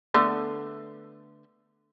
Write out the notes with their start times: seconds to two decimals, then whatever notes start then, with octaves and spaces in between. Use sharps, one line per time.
0.14 D3 A3 B3